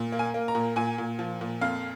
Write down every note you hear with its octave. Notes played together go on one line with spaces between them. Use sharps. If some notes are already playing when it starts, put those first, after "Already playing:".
Already playing: A#2
A#3
G#5
A#3
A#5
A#2
A#2 G#5
A#2
F3
A#2
F2 F5